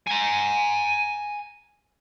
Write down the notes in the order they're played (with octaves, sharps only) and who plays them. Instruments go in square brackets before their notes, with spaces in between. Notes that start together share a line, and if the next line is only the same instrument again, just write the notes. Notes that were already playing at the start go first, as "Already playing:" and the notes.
[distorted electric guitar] G#5 A#5